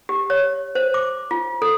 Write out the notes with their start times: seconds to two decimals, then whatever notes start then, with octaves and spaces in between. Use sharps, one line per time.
0.09 G4
0.30 C#5
0.75 C5
0.94 D6
1.31 F4
1.62 A4